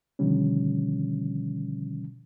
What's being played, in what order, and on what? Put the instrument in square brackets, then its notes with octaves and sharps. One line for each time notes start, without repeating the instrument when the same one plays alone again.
[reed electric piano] B2 D3 D#3 F3 G3 C#4